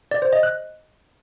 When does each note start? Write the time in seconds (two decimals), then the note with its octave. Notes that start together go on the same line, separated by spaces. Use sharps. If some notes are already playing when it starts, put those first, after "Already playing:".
0.11 D5
0.22 C5
0.33 D#5
0.43 F#6